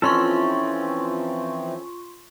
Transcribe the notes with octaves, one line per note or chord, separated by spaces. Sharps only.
E3 F3 C4 C#4 F4 A4 C6 C#6